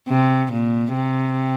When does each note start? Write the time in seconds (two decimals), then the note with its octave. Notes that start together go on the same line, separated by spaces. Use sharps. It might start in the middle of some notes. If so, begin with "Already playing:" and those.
0.08 C3
0.52 A#2
0.94 C3